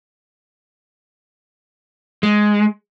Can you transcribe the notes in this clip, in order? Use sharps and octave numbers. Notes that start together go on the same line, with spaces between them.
G#3